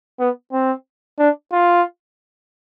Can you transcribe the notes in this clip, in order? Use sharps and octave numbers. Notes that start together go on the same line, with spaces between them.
B3
C4
D4
F4